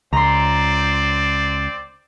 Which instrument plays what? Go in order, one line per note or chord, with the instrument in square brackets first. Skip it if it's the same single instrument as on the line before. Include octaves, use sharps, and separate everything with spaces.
[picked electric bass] C#2 [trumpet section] C4 C5 D5 [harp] A#5 C6